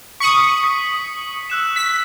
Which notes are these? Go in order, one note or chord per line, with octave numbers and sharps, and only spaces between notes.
C#6 D#6 B6 C#7 F#7
B6
E6 F#6 E7
B6